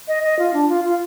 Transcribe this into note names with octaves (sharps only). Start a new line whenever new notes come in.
D#5
D#5
F4
D4
F4
F4